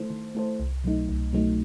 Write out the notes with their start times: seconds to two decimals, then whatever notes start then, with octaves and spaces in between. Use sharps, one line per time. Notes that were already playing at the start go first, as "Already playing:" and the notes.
Already playing: D#3 A3 E4 A4 C5
0.10 D#3
0.35 A3 E4 A4 C5
0.60 C2
0.84 B2 F#3 A3 D#4
1.09 C2
1.33 B2 F#3 A3 D#4